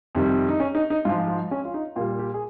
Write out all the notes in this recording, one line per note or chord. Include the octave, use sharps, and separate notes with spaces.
F2 C3 D#3 G3
D#4
C#4
D#4
D#4
G#2 F3 F4
F4
C#4
F4
D#4
A#2 G3 F4
G4
G#4